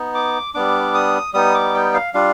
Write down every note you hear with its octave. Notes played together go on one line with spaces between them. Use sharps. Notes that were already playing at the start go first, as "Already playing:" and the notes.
Already playing: B3 D#4
D6
G3 B3 D4 D6
D#6
G3 B3 D#4 D#6
D6
G5
F5
G3 D4 F4 F5